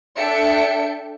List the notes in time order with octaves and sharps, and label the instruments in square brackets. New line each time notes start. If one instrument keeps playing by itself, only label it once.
[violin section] D4 A4 E5 G5 C#7 D7